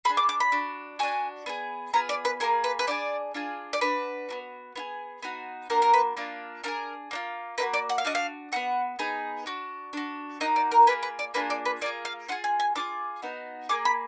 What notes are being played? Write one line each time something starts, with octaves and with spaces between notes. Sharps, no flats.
D4 G#4 B5
D6
D6
B5
D4 F#4
D4 F#4 G#5
B3 D4 G#4
B3 F4 G#4 A#5
D5
B4
A#3 F4 G#4 A#4
B4
B4
D4 F4 G#4 D5
D4 F4 G#4
D5
D4 F#4 B4
B3 D4 F#4
B3 F4 G#4
B3 D#4 F#4
A#3 D4 F#4 A#4
A#4
B4
A#3 D4 F4
D4 F4 G#4 A#4
A#3 D4 F4
A#3 D#4 F#4 B4
D5
F#5
F5
D4 F#4 D#5
F5
B3 D#4 F#4 F#5
B3 D#4 G#4
D4 F#4
D4 F#4
A#3 D#4 F#4 D#5
D5
A#4
A#3 F4 G#4 B4
B4
D5
A#3 D4 F4 G#4 B4
D5
B4
A#3 D4 F4 G#4 D5
F5
D4 F4 G#4 F#5
G#5
G#5
D4 F4 G#4 D6
B3 D#4 F#4
A#3 F4 G#4 D6
B5